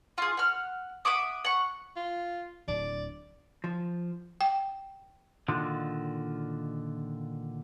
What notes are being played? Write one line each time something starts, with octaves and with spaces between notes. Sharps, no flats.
F4 G#4
F#5 F6
E5 F#5 D6 D#6
F#5 C#6
F4
D1 D3 D5
F3
G5
A#2 D3 D#3 F4 F#4